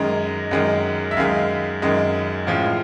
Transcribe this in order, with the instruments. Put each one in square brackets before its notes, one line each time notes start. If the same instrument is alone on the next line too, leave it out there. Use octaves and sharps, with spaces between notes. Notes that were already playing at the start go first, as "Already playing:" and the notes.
Already playing: [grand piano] F#2 D#3 G#3 A#5
F#2 D#3 G#3
E5
F#2 D#3 G#3 F5
F#2 D#3 G#3
A2 F3 G#3 F5